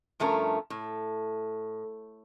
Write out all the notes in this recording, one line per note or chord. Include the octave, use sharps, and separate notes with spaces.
G2 F3 A3 C#4 A#4
A2